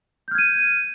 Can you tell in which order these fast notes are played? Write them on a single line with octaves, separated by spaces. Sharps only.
G6 F6 G#6 D#7